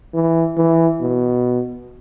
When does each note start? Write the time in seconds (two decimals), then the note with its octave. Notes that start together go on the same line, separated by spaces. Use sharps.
0.14 E3
0.57 E3
1.01 B2